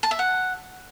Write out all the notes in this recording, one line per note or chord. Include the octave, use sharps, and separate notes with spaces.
A5
E5
F#5